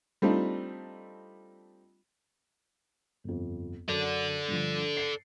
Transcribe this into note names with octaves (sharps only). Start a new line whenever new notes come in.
G3 A3 C4 D4 D#4 F4
G1 F2
F#2 A4 D5
G2 D3 F3
C7 C#7